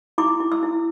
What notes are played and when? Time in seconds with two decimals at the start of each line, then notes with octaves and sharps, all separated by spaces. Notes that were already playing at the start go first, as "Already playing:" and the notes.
0.18 E4 D6
0.40 E4
0.52 E6
0.63 E4